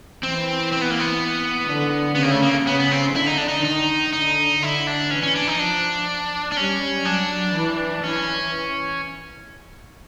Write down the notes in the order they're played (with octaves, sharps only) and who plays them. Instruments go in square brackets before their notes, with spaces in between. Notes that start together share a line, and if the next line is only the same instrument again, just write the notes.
[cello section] E3 [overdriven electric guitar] C4
[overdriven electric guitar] C4
B3
A#3
B3
[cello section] D3
[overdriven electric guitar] B3
[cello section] C#3 [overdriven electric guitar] A#3
[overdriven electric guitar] A3
A#3
[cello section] C#3 [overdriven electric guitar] B3
[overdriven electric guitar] B3
C4
[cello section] D3 [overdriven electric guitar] E4
[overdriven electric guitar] D#4
D4
D#4
[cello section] D#3 [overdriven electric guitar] D#4
[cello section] D3 [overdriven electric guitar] D#4
[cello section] D3 [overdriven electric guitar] E4
[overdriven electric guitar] D4
[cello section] E3 [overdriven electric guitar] C#4
[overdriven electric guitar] C#4
D4
D#4
[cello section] F3 [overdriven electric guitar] D4
[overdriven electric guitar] D4
[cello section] G3 [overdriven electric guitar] C#4
[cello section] F#3 [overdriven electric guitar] D4
[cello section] E3
[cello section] E3 [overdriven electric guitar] C#4